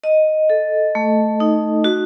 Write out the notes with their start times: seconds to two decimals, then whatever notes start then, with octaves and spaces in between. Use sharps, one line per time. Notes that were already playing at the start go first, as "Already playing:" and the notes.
0.04 D#5
0.50 A4
0.95 A3
1.40 D#4
1.84 F#4